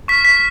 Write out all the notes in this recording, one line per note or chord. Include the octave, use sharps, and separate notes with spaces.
C#6 F6 B6
B6